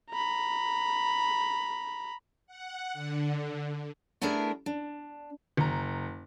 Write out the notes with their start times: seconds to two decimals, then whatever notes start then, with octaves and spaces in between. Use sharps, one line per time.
0.11 A#5 B5
2.47 F#5
2.93 D3
4.22 A3 B3 D4 E4 G#4 A#4
4.66 D4
5.57 F#1 A#5